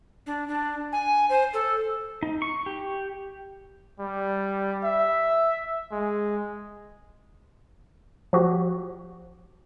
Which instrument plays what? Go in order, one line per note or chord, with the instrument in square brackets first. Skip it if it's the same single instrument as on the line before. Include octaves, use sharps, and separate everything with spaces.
[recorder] D4
D4
G#5
C5
A4
[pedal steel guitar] D#4
C#6
G4
[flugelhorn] G3
E5
G#3
[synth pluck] F3 F#4 G4